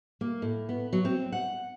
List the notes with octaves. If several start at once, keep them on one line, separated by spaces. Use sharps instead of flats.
A#3
A2
B3
F#3
C4
F#5